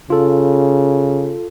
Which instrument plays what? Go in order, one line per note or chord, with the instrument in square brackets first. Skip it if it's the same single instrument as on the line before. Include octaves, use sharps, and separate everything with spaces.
[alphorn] C#3 [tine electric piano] F4 A4